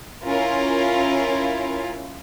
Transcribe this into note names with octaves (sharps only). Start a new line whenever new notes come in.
C#4 E4 F4 A#4